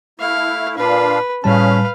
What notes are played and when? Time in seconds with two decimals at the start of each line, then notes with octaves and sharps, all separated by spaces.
0.20 A3 E4 F5
0.77 A#2 D4 B4 F5
1.44 A2 C#3 G3 C#4 B4 F5 A5